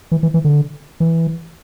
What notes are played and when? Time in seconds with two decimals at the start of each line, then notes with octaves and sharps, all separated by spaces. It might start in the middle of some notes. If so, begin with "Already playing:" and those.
0.12 E3
0.23 E3
0.34 E3
0.45 D3
1.00 E3